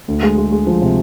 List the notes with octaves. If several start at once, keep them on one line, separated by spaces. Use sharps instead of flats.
D2
G#3
G#3
G#3
F3
C3